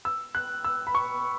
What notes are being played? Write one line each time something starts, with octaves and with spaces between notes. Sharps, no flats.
E6
F#6
E6
B5
C#6